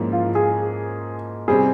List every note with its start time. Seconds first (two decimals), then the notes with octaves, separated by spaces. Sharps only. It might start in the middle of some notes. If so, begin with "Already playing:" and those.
Already playing: G#2 F3 A#3 C#4 E4
0.12 F4
0.35 G#4
1.48 C3 G3 C4 G#4